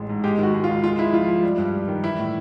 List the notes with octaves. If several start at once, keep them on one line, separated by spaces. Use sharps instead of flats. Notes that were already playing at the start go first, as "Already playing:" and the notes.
Already playing: A1 G#3
G#2
G#3 G4
D#3
F#4
G#3
F4
C#2
G#3 F4
G#3 E4
F3 F4
F3
G3
G2
G3
D#3
E3 E4
A2